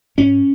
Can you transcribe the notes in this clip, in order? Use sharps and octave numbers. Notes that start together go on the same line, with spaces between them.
G#2 C#4